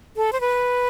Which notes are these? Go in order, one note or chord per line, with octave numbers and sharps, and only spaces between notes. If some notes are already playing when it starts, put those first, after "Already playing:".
A4
C5
B4